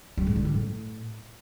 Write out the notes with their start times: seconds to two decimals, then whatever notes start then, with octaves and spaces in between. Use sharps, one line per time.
0.17 G3
0.27 G#2
0.36 D3
0.45 G3
0.54 A2